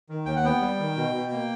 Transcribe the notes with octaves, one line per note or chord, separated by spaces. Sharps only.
D#3
D#2 G5
F#5
B3 G5
G3
D#3
B2
B2
A#3